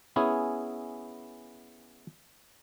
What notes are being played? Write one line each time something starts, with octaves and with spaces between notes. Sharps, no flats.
B3 C#4 E4 G#4